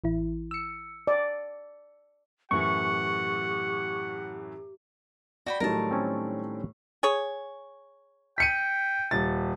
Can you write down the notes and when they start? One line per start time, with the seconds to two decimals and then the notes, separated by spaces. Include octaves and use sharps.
0.04 A1 E3 E4
0.51 E6 C#7
1.07 D5
2.51 F#2 A2 E3 G4 F#5 C#6
5.46 F#4 D5 G5 B5
5.60 A2 D#3 F#3 G3 D#4 A#4 A5
5.91 C4 C#4 A4
7.03 G#4 C#5
8.38 G5 B6 C#7 D#7
9.11 D#1 A6